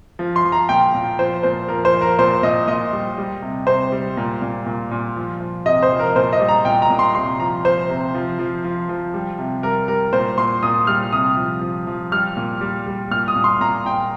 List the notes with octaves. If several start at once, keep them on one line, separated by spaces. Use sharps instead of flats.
F3
C6
F3
A#5
A#2 G5
A#2
F3 C5
A#2 C5
F3 A#4
C5
F3
A#4
A#2 C5
A#2 D#5
A#2 D#5
G3
G3
C3
C3 C5
G3
A#2
A#2
A#2
A#2
F3
F3
C3 D#5
C5
F3
A#4
A#2 C5
D#5
G3
A#5
A#2 G5
A#5
A#2
C6
C3 C6
F3 A#5
F3 C5
C3
F3
F3
F3
F3
G3
C3
G3 A#4
G3 A#4
A#2 C5
A#2 C6
A#2 D#6
G3 F6
C3 D#6
F3
F3
F3
G3 F6
A#2
G3
G3
A#2 F6
D#6
A#2
C6
A#2 A#5
A#2 G5